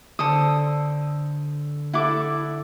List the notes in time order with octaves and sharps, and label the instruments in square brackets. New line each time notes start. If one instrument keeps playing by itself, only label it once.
[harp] D3 [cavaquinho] A4 C5 D#6
[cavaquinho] E4 D6 [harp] A4 F#5